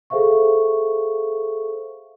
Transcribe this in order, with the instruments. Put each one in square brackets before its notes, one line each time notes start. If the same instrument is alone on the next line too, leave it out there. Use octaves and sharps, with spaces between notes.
[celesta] G#4 A4 C5 E5 F5 C#6